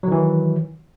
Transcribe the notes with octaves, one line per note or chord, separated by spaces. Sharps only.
D#3 E3 F#3